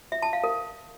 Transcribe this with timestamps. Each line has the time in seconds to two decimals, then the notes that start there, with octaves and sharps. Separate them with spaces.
0.12 E5
0.22 A5
0.33 F5
0.44 A#4